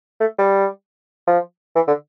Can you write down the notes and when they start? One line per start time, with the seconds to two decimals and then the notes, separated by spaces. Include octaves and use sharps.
0.20 A3
0.38 G3
1.27 F3
1.76 E3
1.87 D3